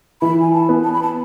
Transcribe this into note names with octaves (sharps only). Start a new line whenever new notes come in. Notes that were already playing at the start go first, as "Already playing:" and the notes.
E3 B5
G#5
A5
B3
A5
B5
A5